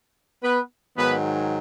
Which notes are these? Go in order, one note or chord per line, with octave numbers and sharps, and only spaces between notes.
B3 B4
G#2 D#3 F#3 B3 B4